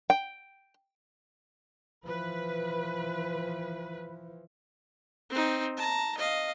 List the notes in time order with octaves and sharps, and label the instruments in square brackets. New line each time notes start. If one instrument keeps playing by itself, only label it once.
[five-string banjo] G5
[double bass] E3 F3 [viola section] B4
[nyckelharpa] C4 D#4
A5 A#5
D#5 F5